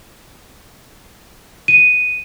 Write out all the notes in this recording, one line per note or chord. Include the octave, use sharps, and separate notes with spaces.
D#7